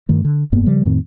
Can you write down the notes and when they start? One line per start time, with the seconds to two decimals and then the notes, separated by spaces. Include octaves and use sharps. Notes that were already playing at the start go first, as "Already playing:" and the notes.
0.09 G2 D#3 A3
0.25 D3
0.52 F1 G2 A#3 B3
0.66 C#3 F3 G3
0.85 F2 A2 D#3 C4